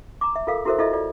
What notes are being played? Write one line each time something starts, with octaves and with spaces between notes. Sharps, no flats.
A#5 D6
E5
F4 A4 A#4 F5
E4 F#4 A4 A#4 C5 E5
E4 F4 A4 D#5 E5
F4 A4 D5